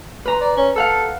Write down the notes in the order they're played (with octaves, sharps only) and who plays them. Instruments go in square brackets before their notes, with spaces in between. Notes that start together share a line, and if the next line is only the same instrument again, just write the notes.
[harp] B4 A#5 C6
[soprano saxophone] D5
C#4
[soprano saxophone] A4 [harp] F5 F#5 E6